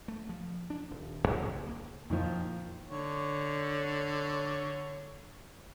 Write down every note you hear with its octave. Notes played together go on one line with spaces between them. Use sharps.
A3
F3
D4
D#1
D2
C#2
A#3
F2 A#2 D#3 F3 C#6
D3 C#5